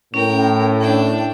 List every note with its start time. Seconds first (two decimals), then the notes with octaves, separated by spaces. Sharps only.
0.14 A2 C#4 A#4 G5
0.80 D4 G5